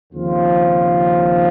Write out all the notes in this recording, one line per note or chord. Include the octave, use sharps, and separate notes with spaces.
D#2 C#3 F3 C4 F4